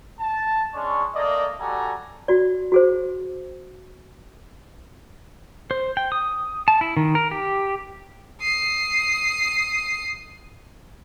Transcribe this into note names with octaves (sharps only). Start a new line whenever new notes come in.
A5
G#3 C#4 D4 C#6
A3 A#3 D5 D#5
G3 F#4 A4 D5 G#5 A#5
F#4 D5
F#4 G#4 C5
C5
G5
D#6
A5
E4
D#3
A#4
G4
D#6 C7